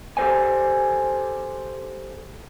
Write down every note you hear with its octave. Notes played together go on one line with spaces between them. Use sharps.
G4 A4 A#4 C5 D5 G#5